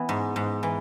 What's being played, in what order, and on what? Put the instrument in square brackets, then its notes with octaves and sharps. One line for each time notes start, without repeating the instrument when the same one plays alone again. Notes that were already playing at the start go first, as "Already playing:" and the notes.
Already playing: [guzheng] E3 B3
G#2
G#2
E3